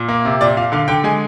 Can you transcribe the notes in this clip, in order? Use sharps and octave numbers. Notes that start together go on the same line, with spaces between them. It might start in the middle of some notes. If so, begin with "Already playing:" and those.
Already playing: A#2
A#3
C3
A#2 D5
A#2 F5
D3 F5
D3 G5
G#3 G#5